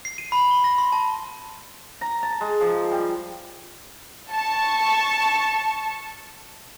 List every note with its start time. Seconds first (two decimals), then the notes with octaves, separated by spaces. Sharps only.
0.05 C7
0.18 D#7
0.32 B5
0.51 G7
0.64 A#6
0.78 C6
0.92 A5
2.01 A#5
2.23 A5
2.41 G#3
2.61 F3
2.91 G3
4.31 A5 C#6